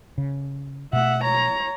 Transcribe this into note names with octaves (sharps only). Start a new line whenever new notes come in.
C#3
B2 A3 E5 F#5
C#5 A#5